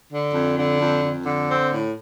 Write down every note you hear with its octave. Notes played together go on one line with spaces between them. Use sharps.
D3
F2
D3
F2
F2
D3
C4
A2